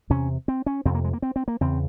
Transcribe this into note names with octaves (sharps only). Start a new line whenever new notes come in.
E2 C3 C#4
C4
C#4
F2 C3 C4
A#3
G#3
A#3
C4
C4
A#3
E2 C#3 C4